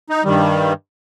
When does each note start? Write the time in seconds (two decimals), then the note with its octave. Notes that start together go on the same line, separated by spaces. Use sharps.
0.10 D#4
0.24 G2 D#3 G3